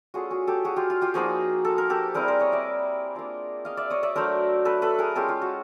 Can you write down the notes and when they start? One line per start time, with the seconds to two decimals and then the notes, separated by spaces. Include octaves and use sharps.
0.14 A3 C#4 F4 F#4 G#4
0.30 F#4 G#4
0.47 G4 A4
0.65 F#4 G#4
0.76 F4 G4
0.90 F4
1.02 F4 G4
1.14 F3 A#3 D#4 F#4 G#4
1.65 A4
1.78 A#4
1.90 G4 A4
2.14 G3 C4 E4 G#4 A#4
2.28 A#4 C5
2.39 C#5 D#5
2.52 D5 E5
3.15 A#3 D4 F4
3.65 D#5 F5
3.77 D5 E5
3.90 C#5 D#5
4.03 D5 E5
4.16 F#3 A3 D4 A#4 C5
4.65 A4 B4
4.82 A4 B4
4.99 G#4 A#4
5.15 G#3 C#4 F4 G4 A4
5.28 F4 G4
5.42 F#4